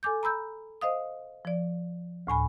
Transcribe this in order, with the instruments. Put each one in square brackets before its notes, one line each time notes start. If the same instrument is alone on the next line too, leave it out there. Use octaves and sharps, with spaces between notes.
[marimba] A4 G#5 D6 G6
A#5 B5 E6 G6
C5 D#5 F5 D#6
F3 D5
D2 A2 G#5 B5